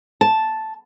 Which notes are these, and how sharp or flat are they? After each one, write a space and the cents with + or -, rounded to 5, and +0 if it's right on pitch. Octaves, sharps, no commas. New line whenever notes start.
A5 -5